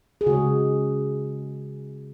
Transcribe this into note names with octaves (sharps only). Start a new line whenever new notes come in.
G#4
C#3 G#3 F#4